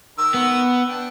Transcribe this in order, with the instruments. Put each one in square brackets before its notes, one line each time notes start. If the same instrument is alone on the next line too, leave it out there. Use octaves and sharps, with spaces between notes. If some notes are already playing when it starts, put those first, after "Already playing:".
[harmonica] D#3 A#4 E6
[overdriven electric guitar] B3
[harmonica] D4 G5